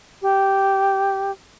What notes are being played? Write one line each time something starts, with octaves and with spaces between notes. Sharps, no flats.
G4